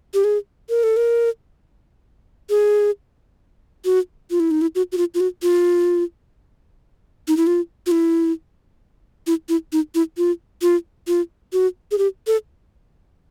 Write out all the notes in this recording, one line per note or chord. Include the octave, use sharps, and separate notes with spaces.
G4
G#4
A#4
A4
A#4
G#4
F#4
F4
E4
D#4
E4
F#4
F#4
F4
F4
F#4
F4
D#4
E4
F4
F4
E4
E4
E4
D#4
E4
F4
F4
F4
F#4
G#4
G4
A4